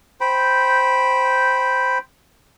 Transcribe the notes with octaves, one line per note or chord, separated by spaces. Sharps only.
C5 G5 B5